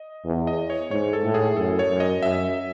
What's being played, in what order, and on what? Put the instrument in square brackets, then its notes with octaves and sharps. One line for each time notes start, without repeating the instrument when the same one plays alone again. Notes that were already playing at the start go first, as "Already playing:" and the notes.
Already playing: [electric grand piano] D#5
[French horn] E2
[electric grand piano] D#5
C#5
[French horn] G#2 [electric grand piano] C#5
[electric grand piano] A4
[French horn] A2
[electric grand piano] G#4
[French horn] F#2 [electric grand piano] A4
[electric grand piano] C#5
[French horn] F#2
[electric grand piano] D#5
[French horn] F#2 [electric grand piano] E5